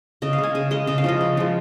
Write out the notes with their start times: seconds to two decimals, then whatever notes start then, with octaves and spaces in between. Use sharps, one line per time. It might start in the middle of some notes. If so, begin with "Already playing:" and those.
0.22 C#3 D#5
0.33 F5
0.38 G#3
0.43 G#5
0.55 C#3 G#5
0.71 G#3 D#5
0.87 C#3 D#5
0.98 F5
1.04 F3 G#3 D#5
1.21 C#3
1.37 F3 G#3